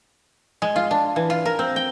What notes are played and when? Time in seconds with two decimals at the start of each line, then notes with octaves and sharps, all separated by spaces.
0.62 G#3
0.76 F4
0.91 D4
1.16 E3
1.30 F4
1.45 A#4
1.59 C4
1.76 G5